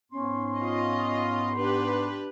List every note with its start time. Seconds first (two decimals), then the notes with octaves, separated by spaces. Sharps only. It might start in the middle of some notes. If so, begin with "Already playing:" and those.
0.12 G#2 B3 C#4 C6
0.57 F4 D#5
1.57 D4 G4 B4